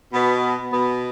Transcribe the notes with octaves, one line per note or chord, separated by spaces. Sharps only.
B2 B3
B2 B3